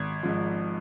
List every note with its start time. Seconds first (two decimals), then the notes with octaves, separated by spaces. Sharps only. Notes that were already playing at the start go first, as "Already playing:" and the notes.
Already playing: G#1 G#6
0.23 G#2 F3